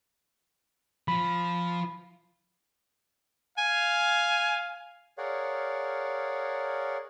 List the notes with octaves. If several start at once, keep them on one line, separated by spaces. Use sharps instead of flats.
F3 B5
F5 G#5
G#4 A#4 C#5 D5 F5 F#5